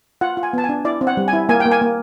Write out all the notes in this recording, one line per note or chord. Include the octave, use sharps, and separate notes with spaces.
F4 F#5
F4
G#5
B3 A5
G#5
D4
E4 D5
C4
F#5
G3
G#5
E4
A#3 G#5
G5
A#3
G#5
A#3